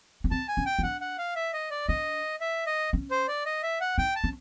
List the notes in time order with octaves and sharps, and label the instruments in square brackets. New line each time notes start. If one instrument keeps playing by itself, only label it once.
[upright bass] C#4
[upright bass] C4 [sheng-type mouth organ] A5
[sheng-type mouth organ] G#5
[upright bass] C#4
[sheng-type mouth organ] G5
[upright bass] D#4
[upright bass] D4 [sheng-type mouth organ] F#5
[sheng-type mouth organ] F#5
F5
E5
D#5
D5
[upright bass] D4 [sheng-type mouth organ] D#5
[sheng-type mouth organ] E5
D#5
[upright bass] C#4
[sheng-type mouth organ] C5
D5
D#5
E5
F#5
[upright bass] D#4 [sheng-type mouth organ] G5
[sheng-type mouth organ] A5
[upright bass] C#4